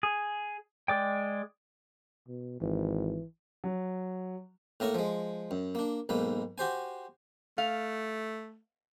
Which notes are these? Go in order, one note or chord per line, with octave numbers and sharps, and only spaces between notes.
G#4
G#3 D5 G5
B2
G#1 E3
F#3
A2 A#3 A#4 C#5 C#6
F3 G#3
F#2
A#3 D4
B1 G#2 A#3 B4
F#4 G4 C5 G#5
A3 F5